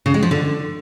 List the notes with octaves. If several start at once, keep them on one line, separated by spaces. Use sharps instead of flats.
C#3
G#3
F3
D3